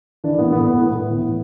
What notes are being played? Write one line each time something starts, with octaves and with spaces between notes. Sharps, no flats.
E3 D4
A2 B3
E3 B3
A2 B3
A2
A2
E3
A2